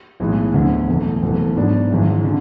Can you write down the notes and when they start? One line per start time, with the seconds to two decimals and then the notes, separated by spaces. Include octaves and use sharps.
0.20 B1 A2 E3 G#3 B3
0.54 D2 D3 F#3 B3
0.88 F#1 E2 B2 A3
1.22 F#1 E2 B2 A3
1.56 G#2 F#3 B3 D4
1.90 G#1 F#2 E3 G#3
2.24 D3